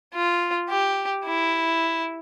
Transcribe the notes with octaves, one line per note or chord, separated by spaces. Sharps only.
F4
G4
E4